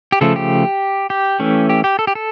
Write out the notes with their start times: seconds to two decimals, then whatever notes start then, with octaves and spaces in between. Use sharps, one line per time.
0.12 G4
0.21 C#3 F3 A3 A4
0.36 G4
1.10 G4
1.40 E3 A3 C#4
1.69 G4
1.84 G4
1.99 A4
2.07 G4
2.15 A4